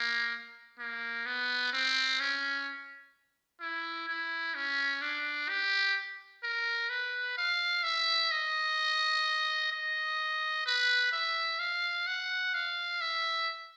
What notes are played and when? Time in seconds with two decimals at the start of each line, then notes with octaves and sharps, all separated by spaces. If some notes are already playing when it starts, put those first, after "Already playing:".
Already playing: A#3
0.79 A#3
1.26 B3
1.73 C4
2.20 C#4
3.61 E4
4.08 E4
4.55 C#4
5.01 D4
5.49 G4
6.43 A#4
6.89 B4
7.37 F5
7.84 E5
8.31 D#5
9.72 D#5
10.66 B4
11.12 E5
11.59 F5
12.07 F#5
12.54 F5
13.01 E5